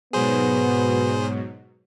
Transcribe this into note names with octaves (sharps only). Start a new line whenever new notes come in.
G#2 B2 F#3 B3 G#4 C5